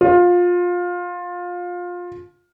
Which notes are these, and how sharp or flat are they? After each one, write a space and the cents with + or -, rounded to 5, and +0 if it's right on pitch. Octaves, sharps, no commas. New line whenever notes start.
F4 +20